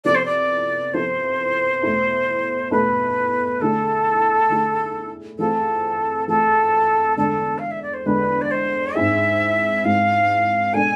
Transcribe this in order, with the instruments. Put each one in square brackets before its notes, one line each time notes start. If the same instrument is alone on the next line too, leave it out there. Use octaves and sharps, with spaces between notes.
[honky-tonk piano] C3 F3 B3 E4 A4 [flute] D5
[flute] C5
D5
[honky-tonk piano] C3 F3 B3 E4 A4 [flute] C5
[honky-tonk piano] E2 B2 A3 E4 A4
[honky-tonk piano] E2 B2 A3 E4 A4 [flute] B4
[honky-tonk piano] D3 A3 E4 G#4 [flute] A4
[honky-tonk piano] D3 A3 E4 G#4
[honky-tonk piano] E3 A3 C4 F4 G#4 [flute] A4
[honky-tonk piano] E3 A3 C4 F4 G#4 [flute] A4
[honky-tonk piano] E2 D3 G#3 D4 [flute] A4
[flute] F5
E5
D5
C5
[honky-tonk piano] E2 D3 G#3 D4 [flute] B4
[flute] D5
C5
[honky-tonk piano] G#2 G#3 C4 E4 G#4 [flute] E5
[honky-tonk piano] G#2 G#3 C4 E4 G#4 [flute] F5
[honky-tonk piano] B2 G#3 D4 A4 [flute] G#5